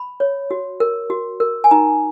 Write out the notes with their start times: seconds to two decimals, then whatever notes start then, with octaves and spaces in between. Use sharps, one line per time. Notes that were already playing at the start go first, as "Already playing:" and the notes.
Already playing: B5
0.20 C#5
0.51 F#4
0.80 A#4
1.10 F#4
1.40 A#4
1.64 G#5
1.71 D#4 A#5